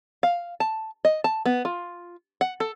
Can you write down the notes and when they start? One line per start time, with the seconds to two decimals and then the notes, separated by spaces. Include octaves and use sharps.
0.23 F5
0.60 A5
1.05 D#5
1.24 A5
1.46 B3
1.65 F4
2.41 F#5
2.60 A4